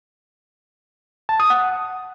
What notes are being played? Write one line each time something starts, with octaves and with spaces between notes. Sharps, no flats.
A5
D#6
F#5